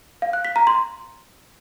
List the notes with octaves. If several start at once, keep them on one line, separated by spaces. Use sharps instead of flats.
F5
F#6
B6
A#5
C6